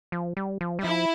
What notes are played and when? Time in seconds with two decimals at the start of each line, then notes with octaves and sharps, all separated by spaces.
0.12 F3
0.37 G3
0.61 F3
0.79 G3
0.84 F3 E4